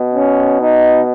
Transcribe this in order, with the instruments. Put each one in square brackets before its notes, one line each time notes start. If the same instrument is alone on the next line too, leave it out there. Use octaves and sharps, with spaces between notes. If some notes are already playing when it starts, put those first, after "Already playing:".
Already playing: [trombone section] B2
C#4
D#4